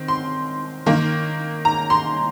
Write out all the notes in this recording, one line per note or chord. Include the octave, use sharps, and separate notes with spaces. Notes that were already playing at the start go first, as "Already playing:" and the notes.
Already playing: D#3 C4
C6
D#3 A#3
A#5
C6